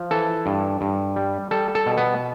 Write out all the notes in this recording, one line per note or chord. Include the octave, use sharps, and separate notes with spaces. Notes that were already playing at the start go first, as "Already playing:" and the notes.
Already playing: F3
E3 A4
G2
G2
G3
G3 A4
A4
B2
B3